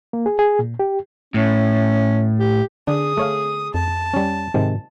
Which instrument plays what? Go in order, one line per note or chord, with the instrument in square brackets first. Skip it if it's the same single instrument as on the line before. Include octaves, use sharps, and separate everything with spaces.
[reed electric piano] A#3
G#4
G#4
A#2
G4
[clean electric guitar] A2 [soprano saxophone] C#4
[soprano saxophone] G4
[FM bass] D3 [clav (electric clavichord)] D4 [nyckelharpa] G#4 D#6
[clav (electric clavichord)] A3 C#5 F5
[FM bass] F2 [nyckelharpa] A5
[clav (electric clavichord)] G3 C#4
[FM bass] G#2 [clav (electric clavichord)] C3 D#3 G#3